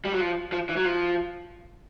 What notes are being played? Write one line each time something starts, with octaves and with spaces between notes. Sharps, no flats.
G3
F#3
F3
F3
E3
F#3
F3